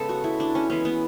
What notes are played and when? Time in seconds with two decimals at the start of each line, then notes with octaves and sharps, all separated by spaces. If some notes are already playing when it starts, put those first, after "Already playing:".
Already playing: C#3 G#3 B3 A4
0.09 F#4
0.24 E4
0.40 D4
0.55 C#4
0.70 E3 G#3 B3 C#4
0.85 B3